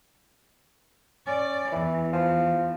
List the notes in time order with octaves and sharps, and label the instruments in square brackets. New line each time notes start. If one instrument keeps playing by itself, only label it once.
[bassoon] C#4 [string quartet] D5
[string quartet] E2 [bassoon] E3
[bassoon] F3